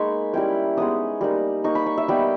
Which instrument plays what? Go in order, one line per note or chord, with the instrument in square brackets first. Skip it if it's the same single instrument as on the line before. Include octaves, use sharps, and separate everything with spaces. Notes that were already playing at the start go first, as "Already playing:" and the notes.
Already playing: [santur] G#3 A#3 D#4 B5 C#6
G3 C#4 E4 G5
G#3 B3 D#4 D#6
G3 A#3 D#4
A#3 D#4 C#6
B5
C#6
E5
G3 B3 D#4 G5